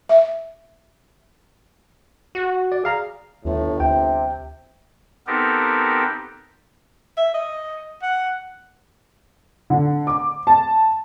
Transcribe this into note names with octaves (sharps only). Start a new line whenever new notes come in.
E5
F#4
D5
G#4 F5 A#5
G1 D#2 A2
D2 C3 G5
B3 C4 D#4 G4 A4 A#4
E5
D#5
F#5
D3
D6
A5